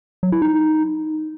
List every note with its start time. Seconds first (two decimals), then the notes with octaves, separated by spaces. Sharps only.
0.23 F#3
0.32 E4
0.42 D#4